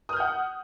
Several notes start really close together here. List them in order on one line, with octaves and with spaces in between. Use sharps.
D#6 F6 G6 F#5